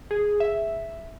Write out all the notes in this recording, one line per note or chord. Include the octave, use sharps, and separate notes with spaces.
G#4
E5